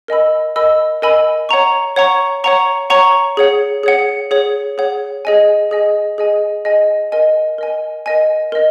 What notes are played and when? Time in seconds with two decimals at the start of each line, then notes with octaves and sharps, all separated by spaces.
0.08 A#4 D#5 G#5 B5 E6
0.56 A#4 D#5 G#5 B5 E6
1.02 A#4 D#5 G#5 B5 E6
1.49 C#5 F#5 A#5 C#6
1.96 C#5 F#5 A#5 C#6
2.44 C#5 F#5 A#5 C#6
2.90 C#5 F#5 A#5 C#6
3.37 G#4 C#5 F#5
3.83 G#4 C#5 F#5
4.31 G#4 C#5 F#5
4.78 G#4 C#5 F#5
5.25 G#4 D#5 G#5
5.71 G#4 D#5 G#5
6.18 G#4 D#5 G#5
6.65 G#4 D#5 G#5
7.12 A#4 D#5 G#5
7.58 A#4 D#5 G#5
8.06 A#4 D#5 G#5
8.52 A#4 D#5